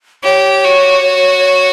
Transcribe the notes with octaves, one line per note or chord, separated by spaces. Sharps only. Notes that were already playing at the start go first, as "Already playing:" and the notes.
G4 C#5
F#4